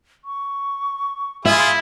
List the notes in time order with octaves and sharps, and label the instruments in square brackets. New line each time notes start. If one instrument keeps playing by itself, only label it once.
[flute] C#6
[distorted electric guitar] E4 [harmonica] F4 G#4 [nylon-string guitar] E5